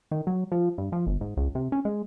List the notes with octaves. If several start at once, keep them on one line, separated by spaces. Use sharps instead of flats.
D#3
F#3
F3
G2
F3
G1
G#2
C#2
C3
C#4
G#3